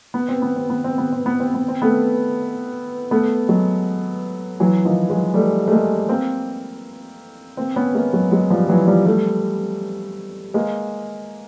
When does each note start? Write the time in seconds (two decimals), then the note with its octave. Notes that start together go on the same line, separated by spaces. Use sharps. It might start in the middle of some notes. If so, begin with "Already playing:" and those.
0.14 B3
0.28 C4
0.42 B3
0.56 C4
0.70 B3
0.84 C4
0.98 B3
1.12 C4
1.26 B3
1.40 C4
1.54 B3
1.68 C4
1.82 A3 B3
3.11 A3 B3
3.48 F#3 G#3
4.60 E3 F#3
4.85 D#3 F3
5.10 F#3 G#3
5.34 G3 A3
5.67 A3
5.71 G#3 A#3
6.09 A#3 C4
7.57 A#3 C4
7.76 B3 C#4
7.94 G#3 A#3
8.13 F#3 G#3
8.32 F#3 G#3
8.50 F3 G3
8.69 E3 F#3
8.87 F3 G3
9.06 G3 A3
10.54 G#3 A#3